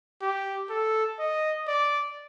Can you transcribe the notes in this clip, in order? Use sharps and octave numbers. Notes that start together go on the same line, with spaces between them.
G4
A4
D#5
D5